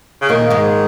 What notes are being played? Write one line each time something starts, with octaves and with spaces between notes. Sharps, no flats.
C#3
A#2 D#3 A#3
G#2 G#3